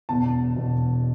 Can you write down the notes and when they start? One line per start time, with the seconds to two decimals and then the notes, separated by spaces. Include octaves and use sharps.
0.09 E1 E2 B2 A5
0.56 E1 E2 B2